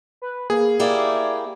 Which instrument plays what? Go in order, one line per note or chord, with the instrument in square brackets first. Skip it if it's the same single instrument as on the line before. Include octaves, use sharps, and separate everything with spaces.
[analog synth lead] B4
[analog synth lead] A#3 [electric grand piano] G#4
[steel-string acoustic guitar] A#3 E4 G4 [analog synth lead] D5